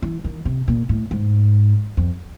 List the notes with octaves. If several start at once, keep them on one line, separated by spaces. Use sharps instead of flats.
E3
D#3
C3
A#2
A2
G#2
F2